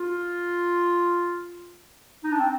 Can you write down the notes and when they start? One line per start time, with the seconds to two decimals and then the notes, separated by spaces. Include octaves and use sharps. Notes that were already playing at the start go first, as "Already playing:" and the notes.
Already playing: F4
2.24 D#4
2.31 D4
2.40 C4